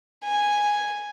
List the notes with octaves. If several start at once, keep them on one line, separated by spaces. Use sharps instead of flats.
G#5